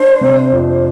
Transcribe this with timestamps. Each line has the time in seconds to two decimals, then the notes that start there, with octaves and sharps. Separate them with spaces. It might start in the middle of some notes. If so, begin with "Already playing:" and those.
Already playing: D4 C5
0.21 C3
0.52 F2